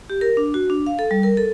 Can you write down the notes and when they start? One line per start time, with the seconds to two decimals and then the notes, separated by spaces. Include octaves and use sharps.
0.10 G4
0.21 A#4
0.37 D4
0.54 F#4
0.70 D4
0.87 F5
0.99 A4
1.11 G3
1.23 A#4
1.37 A4